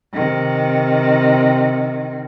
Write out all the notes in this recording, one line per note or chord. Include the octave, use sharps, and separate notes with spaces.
C3 D#3